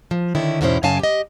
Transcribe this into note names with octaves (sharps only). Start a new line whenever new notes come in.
F3
D3 D#3 C#4 E4
E2 G#2 B2 C#4 E4 C5
F#2 C#3 C#4 F5 G#5 A5
G4 D#5